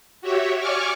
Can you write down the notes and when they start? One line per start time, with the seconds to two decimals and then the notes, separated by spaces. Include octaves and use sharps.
0.21 F#4 G4 C#5 E5
0.59 C#5 D5 G#5 C#6 D6 F6